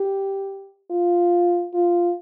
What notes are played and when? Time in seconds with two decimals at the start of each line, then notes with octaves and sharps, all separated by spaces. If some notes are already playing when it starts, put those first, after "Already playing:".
Already playing: G4
0.90 F4
1.74 F4